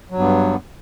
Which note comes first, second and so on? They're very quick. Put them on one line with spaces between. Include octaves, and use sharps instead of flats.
F#3 G2 B3